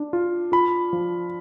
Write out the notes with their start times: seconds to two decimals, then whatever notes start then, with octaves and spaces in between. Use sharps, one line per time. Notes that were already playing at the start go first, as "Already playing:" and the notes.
Already playing: D4
0.13 F4
0.52 F4 B5
0.93 F3